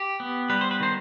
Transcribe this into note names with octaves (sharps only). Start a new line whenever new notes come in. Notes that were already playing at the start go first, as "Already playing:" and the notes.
Already playing: G4
B3
G3 B4
C5
B4
D#3 C5